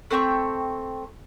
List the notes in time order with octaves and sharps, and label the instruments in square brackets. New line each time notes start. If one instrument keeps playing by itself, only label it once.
[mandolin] A3 C4 G5 C#6